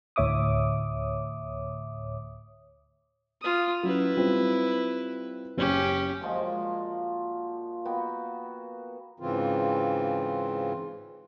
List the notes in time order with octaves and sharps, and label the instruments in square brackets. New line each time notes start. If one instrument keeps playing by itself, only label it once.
[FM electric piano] D2 A2 C#5 E5 D6 D#6
[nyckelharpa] F4 D#6
[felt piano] F#3 C#4 [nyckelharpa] E4 B4
[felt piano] G3 C4 F4
[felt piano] F#1 [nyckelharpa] C#4 G4
[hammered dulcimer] A#2 F3 G#3 F#4
A#3 B3 F#4 G5
[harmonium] G#2 C#3 E3 C4 F4